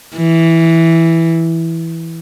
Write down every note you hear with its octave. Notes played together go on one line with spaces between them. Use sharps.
E3